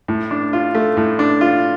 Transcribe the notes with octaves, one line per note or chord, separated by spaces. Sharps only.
A2
D4
F4
A3
A2
D4
F4